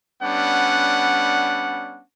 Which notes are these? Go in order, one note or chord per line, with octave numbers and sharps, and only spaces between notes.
G3 B3 C#4 D4 F#5